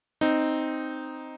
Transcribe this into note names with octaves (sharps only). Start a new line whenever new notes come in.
C4 D#4